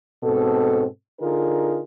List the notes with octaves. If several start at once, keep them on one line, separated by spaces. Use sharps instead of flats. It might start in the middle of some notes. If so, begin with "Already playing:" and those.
G#2 B2 C4 A4
D3 D#4 F4 G#4 A#4